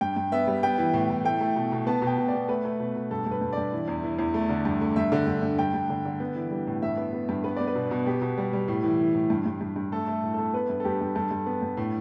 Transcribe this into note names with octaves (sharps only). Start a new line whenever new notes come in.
G2 G5
G2
B3 E5
G3
B3 G5
E3
A2
A2
A3 G5
A3
B2
B2
B3 A5
B2
G5
B2
D5
B3
A3 B4
A3
B2
B2
G2 A4
G2
B4
G2
G2 D5
E3
E2
E3
E2
A3
D3
G2
A3
G2 E5
D3
G2
G2
G2 G5
G2
D3
D3
B3
E3
G3
A2
G2 E5
B3
B3
G2
B3 B4
B3 D5
B4
B2
B2
B3 G4
B2
G3
G3
A2
E3
E3
A2
G2
G2
G2
G2
A3 A4
A3
A2
A3 A4
B3 B4
G2
A4
G2 G4
G2
G2 A4
G2
B3
G2
A2